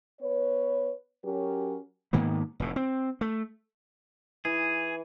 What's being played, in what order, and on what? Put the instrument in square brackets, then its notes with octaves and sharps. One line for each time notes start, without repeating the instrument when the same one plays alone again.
[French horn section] B3 B4 C#5
F#3 C#4 F#4 G4 A#4
[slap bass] G#2 D#3 A#3 B3
F1 A2
C4
A3
[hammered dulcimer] E3 [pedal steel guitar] G#4